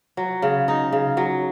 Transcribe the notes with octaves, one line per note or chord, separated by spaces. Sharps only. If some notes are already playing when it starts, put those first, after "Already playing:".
F#3
C#3
D#4
C#3
F#3